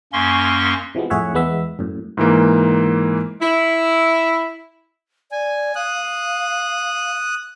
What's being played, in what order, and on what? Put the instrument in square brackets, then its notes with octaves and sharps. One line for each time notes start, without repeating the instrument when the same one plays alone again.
[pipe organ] F#2 A#3 C#4 C6 C#6
[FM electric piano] C3 E3 F3 G#3 B3
F2 A2 G#4 C#5 E5 F#5
E2 G#3 B3 E5
F#2 A2
[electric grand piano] G#2 E3 A#3
[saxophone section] E4
[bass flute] D5 [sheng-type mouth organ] G#5
[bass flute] F5 [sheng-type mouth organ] D#6 F#6